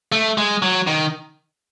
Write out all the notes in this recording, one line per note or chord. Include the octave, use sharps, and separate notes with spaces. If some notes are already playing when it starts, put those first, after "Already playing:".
A3
G#3
F#3
D#3